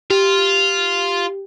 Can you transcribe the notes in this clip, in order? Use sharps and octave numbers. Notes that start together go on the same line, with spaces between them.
F4 G4